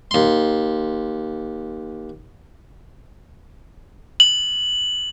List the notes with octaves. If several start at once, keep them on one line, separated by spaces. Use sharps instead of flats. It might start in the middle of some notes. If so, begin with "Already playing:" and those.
D#2 C6
F#7